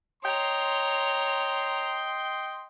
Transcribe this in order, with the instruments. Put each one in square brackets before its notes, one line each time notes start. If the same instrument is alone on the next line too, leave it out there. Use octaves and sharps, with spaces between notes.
[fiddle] C#5 A#5 [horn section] D#5 G5 C6